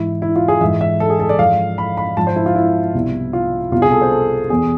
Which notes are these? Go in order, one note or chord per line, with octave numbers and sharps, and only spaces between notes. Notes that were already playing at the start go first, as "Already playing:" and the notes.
Already playing: G#2 E3 E4
E4
F4
G#4
G#2 E3 E5
E5
A4
G#4
A4
D5
G#2 F3 F5
B5
B5
G#2 F3 A5
C5
E4
F4
E4
C2 B2
F4
C2 B2 F4
G#4
A4
C5
A4
E2 B2 G#4